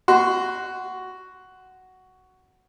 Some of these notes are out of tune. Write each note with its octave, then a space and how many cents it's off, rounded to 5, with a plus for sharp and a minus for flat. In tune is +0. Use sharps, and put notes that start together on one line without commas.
F#4 +5 C6 -15